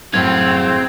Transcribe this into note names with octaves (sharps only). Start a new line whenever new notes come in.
F#2 A2 C4 G#4 F5 G#6